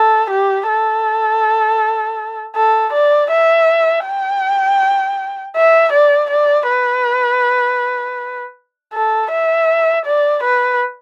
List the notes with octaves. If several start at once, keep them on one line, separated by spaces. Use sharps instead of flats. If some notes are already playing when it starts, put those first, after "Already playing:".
Already playing: A4
G4
A4
A4
D5
E5
G5
E5
D5
D5
B4
A4
E5
D5
B4